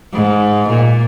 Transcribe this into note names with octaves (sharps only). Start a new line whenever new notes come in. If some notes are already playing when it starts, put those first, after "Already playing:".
G#2
A#2